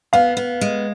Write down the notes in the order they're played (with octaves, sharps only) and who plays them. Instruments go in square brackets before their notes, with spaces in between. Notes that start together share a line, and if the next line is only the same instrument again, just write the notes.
[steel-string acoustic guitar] B3 [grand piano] F5
[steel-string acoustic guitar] B3
G#3